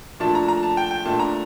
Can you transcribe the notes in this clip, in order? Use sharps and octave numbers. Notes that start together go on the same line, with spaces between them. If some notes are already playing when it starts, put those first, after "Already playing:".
A#2 F3 A3 D4 A5
A#5
A#5
A5
G5
G5
A#2 A3 D4 A5
A#5